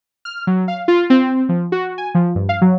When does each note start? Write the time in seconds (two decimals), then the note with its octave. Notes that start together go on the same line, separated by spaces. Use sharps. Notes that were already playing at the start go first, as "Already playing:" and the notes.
0.25 F6
0.47 F#3
0.68 F5
0.88 F4
1.10 C4
1.49 F3
1.72 F#4
1.98 G#5
2.15 F3
2.35 G2
2.49 F5
2.62 F#3